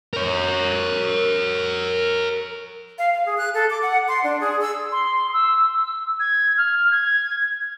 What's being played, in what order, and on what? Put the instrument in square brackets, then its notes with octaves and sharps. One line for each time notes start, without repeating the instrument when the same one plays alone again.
[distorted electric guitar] A#4 C#5
[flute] F5
F5
G#4
F#6
A4
D6
F#5
C6
D4
G#4
E6
[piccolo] C6
E6
E6
G#6
F6
G#6